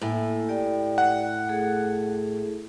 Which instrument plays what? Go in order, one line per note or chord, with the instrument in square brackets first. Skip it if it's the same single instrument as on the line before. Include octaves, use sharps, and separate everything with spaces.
[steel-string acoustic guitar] A2 [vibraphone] A#3 E4 G#5
[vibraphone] G4 D5 G5
[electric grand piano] F#5
[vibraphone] A3 G#4 A4